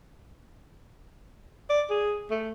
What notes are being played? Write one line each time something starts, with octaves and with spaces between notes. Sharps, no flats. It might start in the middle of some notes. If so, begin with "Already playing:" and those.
D5
G#4
A3